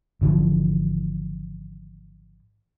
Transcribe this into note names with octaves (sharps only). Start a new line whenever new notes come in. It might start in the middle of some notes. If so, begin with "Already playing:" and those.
G#1 D3 E3 F3